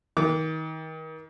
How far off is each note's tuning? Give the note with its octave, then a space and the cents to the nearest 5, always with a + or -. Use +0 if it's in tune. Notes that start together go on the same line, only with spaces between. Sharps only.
D#3 +30 D6 -25